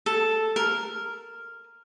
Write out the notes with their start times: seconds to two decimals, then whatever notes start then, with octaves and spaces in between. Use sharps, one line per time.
0.06 A4
0.56 A#4